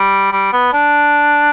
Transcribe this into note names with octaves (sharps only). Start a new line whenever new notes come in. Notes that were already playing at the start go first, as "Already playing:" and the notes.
Already playing: G3
G3
B3
D4